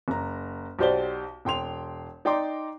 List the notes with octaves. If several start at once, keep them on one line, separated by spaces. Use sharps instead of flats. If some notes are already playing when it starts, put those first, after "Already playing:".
F#1 A#5
B1 F#4 G4 C5 D5 G7
E1 G5 C6 F7
D#4 D5 G5 A#5 C6 D6